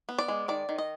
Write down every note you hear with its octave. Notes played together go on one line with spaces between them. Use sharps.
B3
D5
G#3
D#3 D5
D#3
D#5